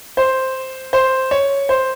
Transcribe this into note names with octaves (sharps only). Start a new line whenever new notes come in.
C5
C5
C#5
C5